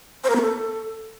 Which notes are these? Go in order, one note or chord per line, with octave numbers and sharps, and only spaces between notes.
C5
A#4
B3
A4